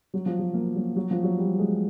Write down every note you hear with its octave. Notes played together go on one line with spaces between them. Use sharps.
F#3
F3
F#3
A#3
F#3
F#3
F3
F#3
G3
G#3